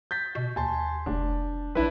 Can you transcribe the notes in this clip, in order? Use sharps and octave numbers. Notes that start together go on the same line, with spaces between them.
G6 A6 B6
B2
D#2 G#5 A5 C6
F1 D4
B1 D4 E4 B4